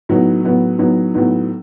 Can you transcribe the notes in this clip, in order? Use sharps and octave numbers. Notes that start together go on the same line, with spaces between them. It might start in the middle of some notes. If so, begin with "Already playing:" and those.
A2 F#3 B3 D#4
A2 F#3 B3 D#4
A2 F#3 B3 D#4
A2 F#3 B3 D#4